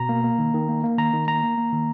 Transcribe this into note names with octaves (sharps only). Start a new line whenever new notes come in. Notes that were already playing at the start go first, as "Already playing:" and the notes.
Already playing: B2 A#5
A#3
A#3
D#3
D#3
A#3
A#3
D#3 A#5
D#3
A#3 A#5
A#3
A#3
D#3